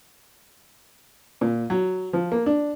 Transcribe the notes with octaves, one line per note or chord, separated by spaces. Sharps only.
A#2
F#3
F3
A#3
D4